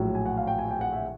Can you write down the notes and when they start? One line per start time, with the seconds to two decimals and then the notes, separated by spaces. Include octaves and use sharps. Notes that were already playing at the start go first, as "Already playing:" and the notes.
Already playing: A#1 A2 F#3
0.15 G#5
0.26 F#5
0.37 F5
0.47 G5
0.59 G#5
0.71 G5
0.81 F#5
0.92 E5